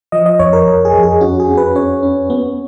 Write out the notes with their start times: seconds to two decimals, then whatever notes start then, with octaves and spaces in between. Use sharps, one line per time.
0.12 F3 D#5
0.26 D#5
0.39 F2 C#5
0.53 A#4
0.67 F2
0.85 G#4
0.94 F2
1.03 G#4
1.21 C#4 F#4
1.40 G#4
1.48 C#4
1.57 B4
1.75 C#4 C#5
2.03 C#4
2.30 B3